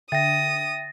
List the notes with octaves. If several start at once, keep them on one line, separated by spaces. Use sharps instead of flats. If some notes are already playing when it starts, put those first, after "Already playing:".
D3 E5 G5 D#6 A6 A#6